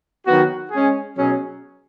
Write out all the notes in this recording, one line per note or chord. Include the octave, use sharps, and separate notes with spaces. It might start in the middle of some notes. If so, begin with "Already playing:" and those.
D#3 F#3 B3 F#4
G#3 C#4 G#4
B2 F#3 C#4 G#4